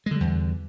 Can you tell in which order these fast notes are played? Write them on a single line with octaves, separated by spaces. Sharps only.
G#3 D3 G3 E2